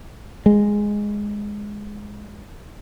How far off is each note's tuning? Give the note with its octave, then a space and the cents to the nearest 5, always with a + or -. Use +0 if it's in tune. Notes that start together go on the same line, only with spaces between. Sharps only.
G#3 -5